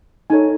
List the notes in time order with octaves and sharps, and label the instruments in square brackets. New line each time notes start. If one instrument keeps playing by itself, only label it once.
[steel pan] D#4 A4 C#5 G#5